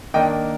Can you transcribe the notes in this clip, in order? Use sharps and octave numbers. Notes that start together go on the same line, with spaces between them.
D#3 A#3 D4 D#5 G5